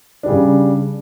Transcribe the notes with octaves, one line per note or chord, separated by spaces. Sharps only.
C#3 G3 D4